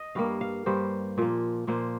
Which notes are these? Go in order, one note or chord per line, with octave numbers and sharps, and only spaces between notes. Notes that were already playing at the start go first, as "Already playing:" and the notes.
Already playing: D#5
G2 G3 A#3 F5
F5
G2 G3 A#3 C5
A#2 F3 A#3
A#2 F3 A#3 C5